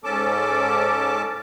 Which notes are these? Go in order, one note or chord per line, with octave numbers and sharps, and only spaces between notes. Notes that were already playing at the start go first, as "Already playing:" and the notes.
G#2 C#4 A4 A5 D6